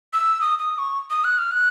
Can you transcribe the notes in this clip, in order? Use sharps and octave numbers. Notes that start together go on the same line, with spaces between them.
E6
D#6
D#6
C#6
D#6
F#6
F6
F#6